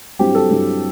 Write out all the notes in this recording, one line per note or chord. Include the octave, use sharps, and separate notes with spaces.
G2 F#3 C4 E4 G4
A4
G2 F#3 C4 E4